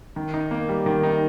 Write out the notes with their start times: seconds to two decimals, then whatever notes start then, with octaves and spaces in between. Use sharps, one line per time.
0.16 D#3
0.34 D#4
0.51 A#3
0.69 G3
0.86 D#3
1.03 D#4